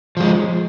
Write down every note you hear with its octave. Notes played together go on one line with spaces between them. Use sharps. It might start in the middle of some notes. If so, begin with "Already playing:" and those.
F3 G#3